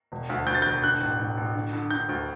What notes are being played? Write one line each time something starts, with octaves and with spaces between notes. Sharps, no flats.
E1
D2
D2 G6
A6
G6
E1
D3 F#6
A1
A1
A1
D3
D3
D3 G6
D2